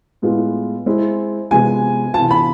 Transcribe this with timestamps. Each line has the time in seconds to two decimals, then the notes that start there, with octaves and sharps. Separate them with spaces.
0.22 A2 G#3 B3 F4
0.86 G#3 C4 E4
1.51 C3 F3 G#3 B3 G#5
2.14 C3 E3 B3 F4 A5
2.31 B5